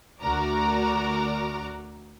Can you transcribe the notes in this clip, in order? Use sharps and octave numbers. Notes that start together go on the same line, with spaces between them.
D2 F#4 A#4 D5 A#5 D6